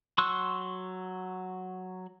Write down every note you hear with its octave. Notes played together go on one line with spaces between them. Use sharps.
F#3 C6 C#6 E6 F#6